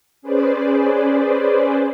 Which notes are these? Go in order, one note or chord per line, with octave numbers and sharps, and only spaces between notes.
C#4 G#4 B4 C5 D5